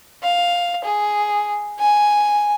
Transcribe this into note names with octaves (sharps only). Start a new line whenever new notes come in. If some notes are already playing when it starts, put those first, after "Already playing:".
F5
G#4
G#5